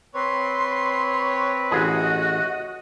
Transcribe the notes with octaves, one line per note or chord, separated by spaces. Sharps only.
C4 B4 C#5 C6
A1 F#4 G#4 D#5